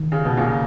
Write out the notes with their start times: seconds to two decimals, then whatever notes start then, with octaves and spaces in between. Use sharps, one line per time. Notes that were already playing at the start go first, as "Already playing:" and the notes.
Already playing: D#3
0.12 C#3
0.25 B2
0.37 A#2 C#3